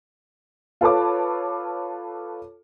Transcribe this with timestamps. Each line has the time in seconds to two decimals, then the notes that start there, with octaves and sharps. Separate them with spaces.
0.81 F4 A4 B4 C#5 A5 D6